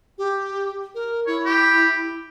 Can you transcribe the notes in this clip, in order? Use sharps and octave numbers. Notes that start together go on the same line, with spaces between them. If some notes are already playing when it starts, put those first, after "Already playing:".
G4
A#4
E4 C#5
G4